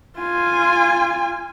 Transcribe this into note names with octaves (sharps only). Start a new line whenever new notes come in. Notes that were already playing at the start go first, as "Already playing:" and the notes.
F4 G#5